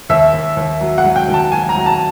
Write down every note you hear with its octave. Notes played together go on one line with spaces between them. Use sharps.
D#2 E5
D#2
D#2
F#3
F#5
F#3
G5
D#3
A5
F#3 G#5
A#5
F#3
A5